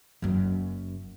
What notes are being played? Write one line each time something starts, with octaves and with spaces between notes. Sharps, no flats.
F#1 F#2